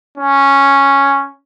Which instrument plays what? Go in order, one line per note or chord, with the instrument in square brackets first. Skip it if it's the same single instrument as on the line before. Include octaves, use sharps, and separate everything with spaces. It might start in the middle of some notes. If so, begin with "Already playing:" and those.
[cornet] C#4